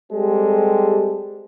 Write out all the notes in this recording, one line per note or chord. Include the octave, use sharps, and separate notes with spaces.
G3 G#3 C4 G4 A4